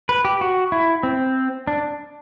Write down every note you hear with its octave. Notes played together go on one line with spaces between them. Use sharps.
B4
G4
F#4
E4
C4
D4